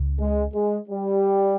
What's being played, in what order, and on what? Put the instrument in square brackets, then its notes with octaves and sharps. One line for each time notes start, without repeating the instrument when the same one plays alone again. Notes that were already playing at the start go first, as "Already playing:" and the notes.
Already playing: [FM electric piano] C#2 C#3
[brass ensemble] G#3
G#3
G3